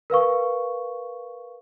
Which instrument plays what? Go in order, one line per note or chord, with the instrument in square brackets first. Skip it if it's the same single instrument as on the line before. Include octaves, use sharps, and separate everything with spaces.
[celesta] A#4 B4 F5 C#6